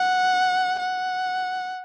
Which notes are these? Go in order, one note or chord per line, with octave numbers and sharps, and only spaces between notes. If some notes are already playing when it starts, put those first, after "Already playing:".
Already playing: F#5
F#5